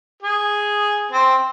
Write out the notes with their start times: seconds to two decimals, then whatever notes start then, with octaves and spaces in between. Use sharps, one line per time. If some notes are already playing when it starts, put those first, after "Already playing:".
0.22 G#4
1.11 C4